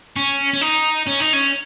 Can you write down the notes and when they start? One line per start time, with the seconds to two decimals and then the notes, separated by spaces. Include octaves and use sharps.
0.16 C#4
0.54 C#4
0.61 D#4
1.07 C#4
1.20 D#4
1.33 C#4